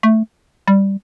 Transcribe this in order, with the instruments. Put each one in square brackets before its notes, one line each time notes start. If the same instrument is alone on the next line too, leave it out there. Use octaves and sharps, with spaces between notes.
[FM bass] A3
G3